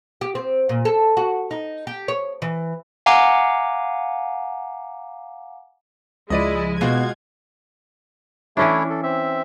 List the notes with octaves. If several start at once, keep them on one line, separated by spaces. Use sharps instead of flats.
G4
C4
A#2
A4
F#4
D#4
G4
C#5
E3
F5 F#5 G#5 A#5 D6
C#2 F3 G#3 E4 D5 D#5 D#7
B2 G#3 F4 F#4 G#6
E3 A3 C#4 D4 E4 C#5
A4
C4 E5